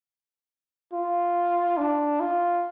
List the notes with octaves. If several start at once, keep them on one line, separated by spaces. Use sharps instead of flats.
F4
D4
F4